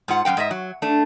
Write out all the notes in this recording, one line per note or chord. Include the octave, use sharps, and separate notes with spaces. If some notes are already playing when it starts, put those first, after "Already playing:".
G#2 F4 F#5
F#2 F3 F5 G5
G#2 D#5 E5
F#3
A3 D4